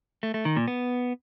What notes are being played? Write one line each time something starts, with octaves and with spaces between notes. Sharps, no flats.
A3
A3
D#3
A#2
B3